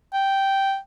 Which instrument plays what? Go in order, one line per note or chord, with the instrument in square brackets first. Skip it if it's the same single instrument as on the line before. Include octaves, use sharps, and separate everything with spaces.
[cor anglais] G5